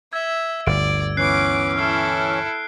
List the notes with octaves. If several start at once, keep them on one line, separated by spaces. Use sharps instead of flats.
E5 E6 G#6
G1 D2 D5 D7
E3 B3 C#4 D6 F#6 C7
E4 A4 F6 C7